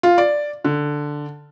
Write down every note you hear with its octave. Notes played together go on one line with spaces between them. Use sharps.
F4
D5
D3